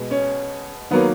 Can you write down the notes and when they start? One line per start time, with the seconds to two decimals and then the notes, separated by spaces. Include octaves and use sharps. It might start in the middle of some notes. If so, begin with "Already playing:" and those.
Already playing: B2 G#3
0.11 C#4
0.91 D#3 F#3 A#3 B3